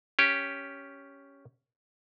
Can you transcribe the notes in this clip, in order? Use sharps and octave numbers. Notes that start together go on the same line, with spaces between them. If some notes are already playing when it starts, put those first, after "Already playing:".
C#4 G4